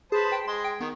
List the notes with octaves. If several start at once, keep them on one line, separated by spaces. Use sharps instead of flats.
G#4 B4 C5 A5
G5
G#3 C6
G5
D#3 B3